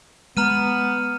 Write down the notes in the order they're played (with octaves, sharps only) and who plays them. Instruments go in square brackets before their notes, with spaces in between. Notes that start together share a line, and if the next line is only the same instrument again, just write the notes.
[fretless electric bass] G#3 [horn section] B3 [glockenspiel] A#5 F6 D#7